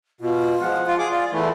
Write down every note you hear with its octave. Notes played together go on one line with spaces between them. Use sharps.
B2 F4
F3 G#3 F#5
F4 F5
G#4 D6
F4 D5
E2 E3 A3 E4